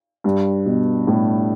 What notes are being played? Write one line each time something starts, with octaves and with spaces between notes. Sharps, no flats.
G2
B2
A2